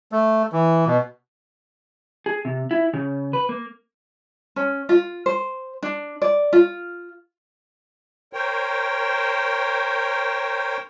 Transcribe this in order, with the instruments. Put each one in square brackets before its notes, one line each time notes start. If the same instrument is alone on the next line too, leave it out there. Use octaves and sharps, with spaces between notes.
[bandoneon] A3
E3
B2
[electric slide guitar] G#4
C3
E4
C#3
B4
A#3
[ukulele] C#4
F4
C5
D4
D5
F4
[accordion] A#4 C5 C#5 G5